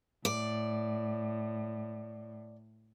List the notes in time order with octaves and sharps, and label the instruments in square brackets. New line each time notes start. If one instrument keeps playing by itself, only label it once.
[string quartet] A2 [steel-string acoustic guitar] D5